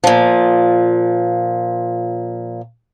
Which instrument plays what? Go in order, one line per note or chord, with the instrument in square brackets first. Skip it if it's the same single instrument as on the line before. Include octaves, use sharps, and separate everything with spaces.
[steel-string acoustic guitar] A#2 F3